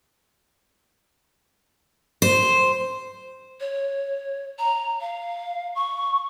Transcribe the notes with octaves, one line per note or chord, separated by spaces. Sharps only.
C5
C#5
A#5
F5
C#6